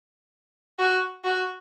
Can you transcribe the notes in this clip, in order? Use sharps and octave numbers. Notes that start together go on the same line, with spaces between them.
F#4
F#4